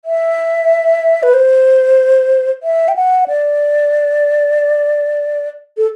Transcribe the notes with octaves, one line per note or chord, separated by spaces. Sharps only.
E5
B4
C5
E5
G5
F#5
D5
A4